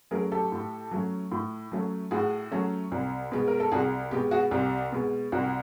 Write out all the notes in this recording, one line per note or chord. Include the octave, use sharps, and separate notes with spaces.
F#3 A3 C#4 G#4 A#4
G4 A4
A2
F#3 A3 C#4
A2
F#3 A3 C#4
A2 F#4 G#4
F#3 A3 C#4
C2
B2 G#3
A#4
A4
C2 F#4 G#4
B2 G#3 G4
F#4 G#4
C2 G4
B2 G#3
C2 F#4